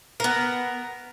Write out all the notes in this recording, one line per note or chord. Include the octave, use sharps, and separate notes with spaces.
B3 A#4